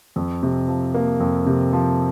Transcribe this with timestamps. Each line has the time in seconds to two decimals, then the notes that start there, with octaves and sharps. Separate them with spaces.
0.16 F2
0.43 C3
0.68 F3
0.94 A#3
1.20 F2
1.47 C3
1.73 F3